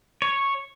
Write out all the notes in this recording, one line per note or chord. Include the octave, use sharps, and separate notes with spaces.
C#5